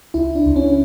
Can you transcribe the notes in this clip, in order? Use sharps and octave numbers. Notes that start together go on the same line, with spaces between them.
C#2 E4
D4
C#2
C#4